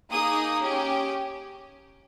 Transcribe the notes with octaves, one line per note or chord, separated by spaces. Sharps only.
A#3 D#4 G#4 D#6
C#4 G4